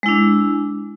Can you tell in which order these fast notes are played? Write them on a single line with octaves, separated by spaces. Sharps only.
G#3 E4 D4